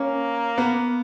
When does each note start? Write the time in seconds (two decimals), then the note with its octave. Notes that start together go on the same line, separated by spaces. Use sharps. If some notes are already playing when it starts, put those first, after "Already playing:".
Already playing: A#3 C#4
0.58 B3